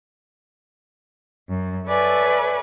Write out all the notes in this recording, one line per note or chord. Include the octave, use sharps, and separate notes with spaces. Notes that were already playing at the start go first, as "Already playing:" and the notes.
F#2
A4 B4 C#5 D5 E5 G#5